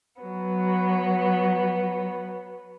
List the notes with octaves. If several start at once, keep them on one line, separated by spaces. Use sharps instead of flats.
F#3 B3